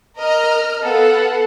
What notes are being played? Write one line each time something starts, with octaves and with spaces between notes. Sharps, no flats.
A#4 D#5 A#5 F6
B3 A4 F5 F#5